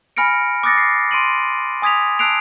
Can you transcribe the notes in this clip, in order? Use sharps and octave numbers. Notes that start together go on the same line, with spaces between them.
G#5 B5 F6 A#6 C#7 D7
D6 D#6 F#6 A6 A#6 C#7
C7
C6 D7 D#7 F#7
G#5 D#6 G#6 B6 F7
A5 E6 F#6 C7 D7 F7